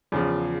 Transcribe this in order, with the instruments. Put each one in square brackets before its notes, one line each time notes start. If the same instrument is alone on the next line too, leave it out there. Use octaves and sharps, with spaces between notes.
[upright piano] E2 C#3 F3